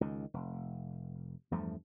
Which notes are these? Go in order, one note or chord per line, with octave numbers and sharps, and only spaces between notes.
C#2 D#3
F1
E2 G2 F3 A3